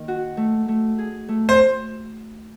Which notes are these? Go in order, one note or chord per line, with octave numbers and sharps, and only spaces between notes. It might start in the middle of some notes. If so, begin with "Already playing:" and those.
Already playing: D#3 A#3
F#4
A3
A3
G#4
A3
C5